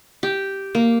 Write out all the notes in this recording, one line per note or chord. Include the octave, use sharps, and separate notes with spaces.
G4
A#3